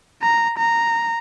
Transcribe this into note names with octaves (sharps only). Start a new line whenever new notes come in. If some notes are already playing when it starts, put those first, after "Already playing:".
A#5
A#5